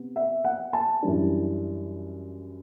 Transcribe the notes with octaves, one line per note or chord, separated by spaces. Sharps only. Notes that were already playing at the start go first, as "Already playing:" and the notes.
Already playing: C3 B3
E5
F#5
A5
F#2 E3 G3 D4